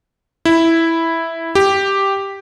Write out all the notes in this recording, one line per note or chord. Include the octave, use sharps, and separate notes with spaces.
E4
G4